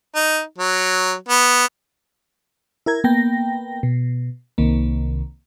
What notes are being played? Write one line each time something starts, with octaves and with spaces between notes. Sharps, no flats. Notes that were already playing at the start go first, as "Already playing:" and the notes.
D#4
F#3
B3
E4 A#4 G#6
A#3 B3 G5 A#6
B2
C2 C3 D#3 A#3